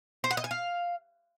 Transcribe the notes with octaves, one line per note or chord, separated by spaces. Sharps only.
C5
F#5
D#5
G#5
F5